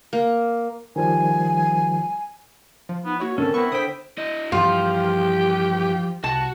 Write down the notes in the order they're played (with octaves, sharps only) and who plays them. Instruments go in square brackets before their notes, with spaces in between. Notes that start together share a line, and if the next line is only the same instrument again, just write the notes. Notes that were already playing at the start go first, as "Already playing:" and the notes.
[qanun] A#3
[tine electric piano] D#3 F3 G3 [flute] G#5
[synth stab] F3
[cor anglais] B3 [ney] D#4
[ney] A#3 [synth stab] E4 F#4 [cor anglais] C#5
[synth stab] G#2 D3 C4 [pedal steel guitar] C#4 [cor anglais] A4 [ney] A#4
[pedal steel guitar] B3 C4 [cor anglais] E4 [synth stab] C#6
[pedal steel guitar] D3 G5 [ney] C5 [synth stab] D#6 B6
[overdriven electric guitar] E4 D#5
[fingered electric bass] G2 E3 [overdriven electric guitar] F3 [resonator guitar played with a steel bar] F4 [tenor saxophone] G4
[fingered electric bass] C2 [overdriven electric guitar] F#4 [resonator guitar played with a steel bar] A5